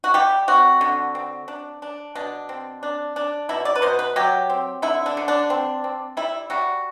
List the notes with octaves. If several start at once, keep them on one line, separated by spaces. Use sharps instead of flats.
F#4
G3 G4
C4 F#4
D3
C4
D4
D4
B2 D4
C4
D4
D4
B2 E4
D5
B4
B2 C5
B4
F#3 G4
C4
D3 E4
D4
D3
D4
C4
C4
G3 E4
G3 F#4